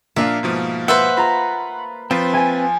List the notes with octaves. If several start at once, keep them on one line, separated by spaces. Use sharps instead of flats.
A#2 A#3 D4 E5 F5 D#7
G#2 B2 F3
B4 C5 E5 F#5
F4 A#5 B5 A#6
F3 C4 F4 B4
G#5 G#6 A6